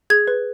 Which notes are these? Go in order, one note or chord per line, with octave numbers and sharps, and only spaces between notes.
G#4 G#6
B4